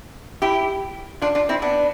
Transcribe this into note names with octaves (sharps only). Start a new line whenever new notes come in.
E4 G4
D4 F4
D4 F4
C4 E4
B3 D4